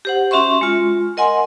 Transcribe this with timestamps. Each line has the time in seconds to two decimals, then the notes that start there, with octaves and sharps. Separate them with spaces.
0.05 G4 C5 F#5
0.31 C#4 F#4 E5 C6 C#6
0.61 G#3 F4
1.17 A#4 D#5 F#5 G#5 C6